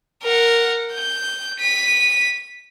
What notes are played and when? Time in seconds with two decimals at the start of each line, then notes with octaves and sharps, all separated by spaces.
0.23 A#4 F#5
0.93 G6
1.60 B6 D#7